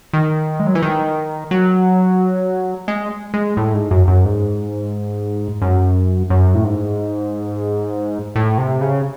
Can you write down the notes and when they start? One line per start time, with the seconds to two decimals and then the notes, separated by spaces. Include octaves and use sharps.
0.13 D#3
0.60 G#3
0.67 F#3
0.75 E3
0.82 D#3
1.51 F#3
2.88 G#3
3.34 G#3
3.57 A2
3.74 G#2
3.91 F#2
4.08 F#2
4.25 G#2
5.61 F#2
6.30 F#2
6.55 A2
6.64 G#2
8.36 A2
8.58 C3
8.81 C#3